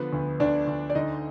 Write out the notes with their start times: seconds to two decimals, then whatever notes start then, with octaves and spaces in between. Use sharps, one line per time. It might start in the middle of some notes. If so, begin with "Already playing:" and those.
Already playing: D3 F3 B3 B4
0.13 D2
0.40 D2 D4 D5
0.68 D2
0.90 D5
0.95 D3 D#4 D#5